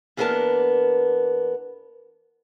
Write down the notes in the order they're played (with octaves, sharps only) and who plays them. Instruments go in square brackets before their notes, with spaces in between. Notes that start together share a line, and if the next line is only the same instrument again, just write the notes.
[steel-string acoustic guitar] E2 A#3 B3 D4 A#4 A5